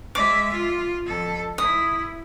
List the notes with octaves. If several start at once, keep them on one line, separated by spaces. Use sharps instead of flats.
G#3 E5 D6
F4
F2 A4
E4 D#6